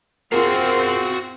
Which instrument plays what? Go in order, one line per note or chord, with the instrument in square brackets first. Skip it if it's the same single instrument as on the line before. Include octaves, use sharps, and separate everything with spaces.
[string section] C4 [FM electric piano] F4 G#4 A#4 [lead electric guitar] F#4 F5